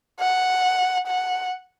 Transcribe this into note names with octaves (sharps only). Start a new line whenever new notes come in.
F#5
F#5